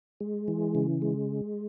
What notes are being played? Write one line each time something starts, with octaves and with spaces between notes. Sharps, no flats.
G#3
E3
C#3
G#3